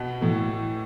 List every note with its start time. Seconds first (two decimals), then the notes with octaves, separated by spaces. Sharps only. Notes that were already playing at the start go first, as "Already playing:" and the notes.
Already playing: B2
0.21 A2 E3 A3